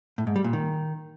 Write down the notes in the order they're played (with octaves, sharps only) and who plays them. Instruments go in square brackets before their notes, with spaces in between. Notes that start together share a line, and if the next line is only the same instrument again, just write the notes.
[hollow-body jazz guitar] A2
G#2
G3
A#2
D#3